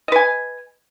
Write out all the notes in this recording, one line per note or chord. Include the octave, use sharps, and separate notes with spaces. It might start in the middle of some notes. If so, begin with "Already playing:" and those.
B4 D#5 G#5